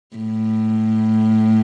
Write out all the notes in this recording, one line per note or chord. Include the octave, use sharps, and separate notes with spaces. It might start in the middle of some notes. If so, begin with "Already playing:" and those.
A2